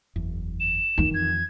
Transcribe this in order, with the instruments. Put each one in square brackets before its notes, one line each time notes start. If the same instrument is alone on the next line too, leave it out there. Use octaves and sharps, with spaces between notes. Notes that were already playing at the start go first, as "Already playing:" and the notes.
[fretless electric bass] F#1 E2
[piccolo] E7
[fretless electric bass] E1 B1 F2 [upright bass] D#3 E3
[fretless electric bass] F2 [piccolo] G#6